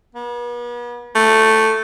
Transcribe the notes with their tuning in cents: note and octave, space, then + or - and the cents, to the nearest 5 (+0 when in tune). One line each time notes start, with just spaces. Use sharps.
B3 -40
A3 +5